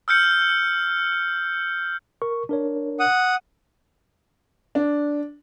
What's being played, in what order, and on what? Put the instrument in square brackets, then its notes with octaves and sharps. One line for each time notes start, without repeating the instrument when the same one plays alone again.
[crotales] E6 F6 G6 C#7
[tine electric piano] A#4 C#6
D4 A#4 C#5
[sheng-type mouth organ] F#5 D#6
[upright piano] D4